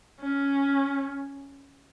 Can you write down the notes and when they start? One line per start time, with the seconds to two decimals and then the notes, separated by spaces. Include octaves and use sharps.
0.21 C#4